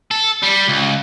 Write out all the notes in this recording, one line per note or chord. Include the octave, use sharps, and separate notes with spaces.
A4
G3
C#2